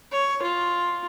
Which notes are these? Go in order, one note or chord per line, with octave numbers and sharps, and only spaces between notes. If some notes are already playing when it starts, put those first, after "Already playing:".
C#5
F4